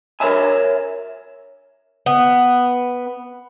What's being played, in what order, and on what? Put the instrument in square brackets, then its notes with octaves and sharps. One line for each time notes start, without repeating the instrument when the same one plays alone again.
[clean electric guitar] A#4 B4 C#5 E5 G#5
[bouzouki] B3